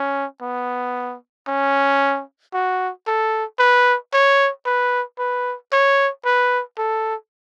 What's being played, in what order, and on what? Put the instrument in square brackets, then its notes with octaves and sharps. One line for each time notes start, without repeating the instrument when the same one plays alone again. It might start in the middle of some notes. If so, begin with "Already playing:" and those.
Already playing: [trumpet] C#4
B3
C#4
F#4
A4
B4
C#5
B4
B4
C#5
B4
A4